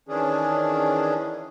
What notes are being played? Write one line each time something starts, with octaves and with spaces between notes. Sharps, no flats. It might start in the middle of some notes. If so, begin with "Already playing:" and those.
D#3 E3 C#4 D4 G#4